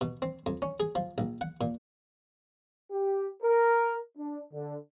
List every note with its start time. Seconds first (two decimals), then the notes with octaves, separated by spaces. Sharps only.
0.01 B2
0.22 C4
0.46 F2
0.62 C#4
0.80 G#4
0.95 F3
1.18 A#1
1.41 F#5
1.61 A#2
2.91 G4
3.43 A#4
4.17 D4
4.53 D3